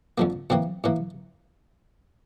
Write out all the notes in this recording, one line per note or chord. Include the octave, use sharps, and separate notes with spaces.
F2 D3 F3 A#3
A2 E3 A#3 C4
A2 E3 A#3